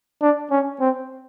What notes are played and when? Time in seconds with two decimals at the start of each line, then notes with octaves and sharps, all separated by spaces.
0.22 D4
0.51 C#4
0.81 C4